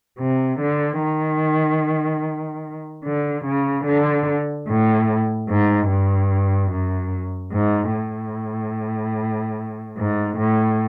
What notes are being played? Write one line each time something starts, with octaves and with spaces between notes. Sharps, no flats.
C3
D3
D#3
D3
C#3
D3
A2
G#2
G2
F#2
G#2
A2
G#2
A2